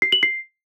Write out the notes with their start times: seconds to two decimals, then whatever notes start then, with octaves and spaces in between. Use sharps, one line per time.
0.02 C7
0.12 F#7
0.23 C7